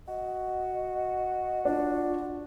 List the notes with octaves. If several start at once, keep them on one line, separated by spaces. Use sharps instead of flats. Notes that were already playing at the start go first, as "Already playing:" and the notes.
F#4 D#5
D4 F4